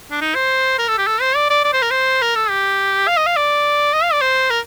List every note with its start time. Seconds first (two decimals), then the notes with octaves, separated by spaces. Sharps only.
0.11 D4
0.21 D#4
0.35 C5
0.78 A#4
0.88 A4
0.98 G4
1.07 A4
1.21 C5
1.36 D5
1.50 D5
1.64 D5
1.73 C5
1.82 A#4
1.91 C5
2.22 A#4
2.35 A4
2.50 G4
3.07 F5
3.17 D#5
3.26 F5
3.36 D5
3.93 D#5
4.03 F5
4.12 D5
4.21 C5
4.50 A#4